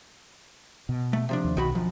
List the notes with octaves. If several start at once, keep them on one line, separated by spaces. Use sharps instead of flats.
B2
A3
C3 F3 D4
D#2
B1 D#3 F#4 B5
F#2 F3